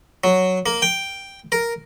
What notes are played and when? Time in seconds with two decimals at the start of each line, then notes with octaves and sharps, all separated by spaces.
0.24 F#3
0.66 A#3
0.82 G5
1.52 A#4